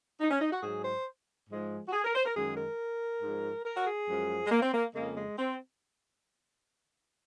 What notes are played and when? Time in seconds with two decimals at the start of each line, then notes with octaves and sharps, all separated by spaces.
0.21 D#4
0.31 C#4
0.41 D#4
0.52 F#4
0.63 G#2 F#3 G#4
0.85 C5
1.50 G#2 F3 G#3
1.88 F#4
1.93 G#4
2.04 A#4
2.15 C5
2.26 A#4
2.36 F#2 D#3 G#3 G#4
2.57 A#4
3.22 G#2 F3 G#3
3.65 A#4
3.77 F#4
3.87 G#4
4.09 F#2 F3 G#3
4.44 G#3
4.51 A#3
4.63 C4
4.74 A#3
4.95 F2 C#3 G#3 A#3
5.17 G#3
5.38 C4